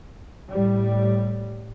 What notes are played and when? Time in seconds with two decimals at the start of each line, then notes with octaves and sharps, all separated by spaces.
0.50 A2 G3